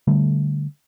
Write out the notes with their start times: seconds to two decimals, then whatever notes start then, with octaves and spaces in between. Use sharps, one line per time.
0.08 D3 G3 A3